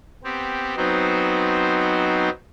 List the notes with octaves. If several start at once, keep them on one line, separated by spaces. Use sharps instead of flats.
B3 C4 G4
F#3 B3 C4 D#4 C5